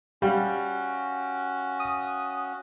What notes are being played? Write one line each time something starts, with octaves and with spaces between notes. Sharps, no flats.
G3 C#4 F#4 F5 G5
D#6